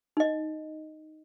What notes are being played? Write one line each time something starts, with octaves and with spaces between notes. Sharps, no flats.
D#4 D#5